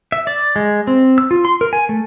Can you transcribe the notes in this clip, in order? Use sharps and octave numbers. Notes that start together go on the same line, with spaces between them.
E5
D5
G#3
C4
E6
F4
C6
A#4
G#5
A3